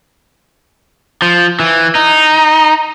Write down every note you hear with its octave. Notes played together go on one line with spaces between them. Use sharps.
F3
E3
D#4